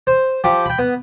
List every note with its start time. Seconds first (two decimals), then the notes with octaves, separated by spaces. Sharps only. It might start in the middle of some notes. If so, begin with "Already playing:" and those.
0.07 C5
0.44 F3 G4
0.66 G5 B5
0.79 B3